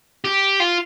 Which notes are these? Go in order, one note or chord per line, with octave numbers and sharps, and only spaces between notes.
G4
F4